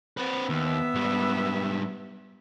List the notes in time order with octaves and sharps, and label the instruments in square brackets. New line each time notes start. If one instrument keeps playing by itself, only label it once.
[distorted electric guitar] C4 B4
[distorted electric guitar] D#2 [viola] B3 E5
[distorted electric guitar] G#2 G3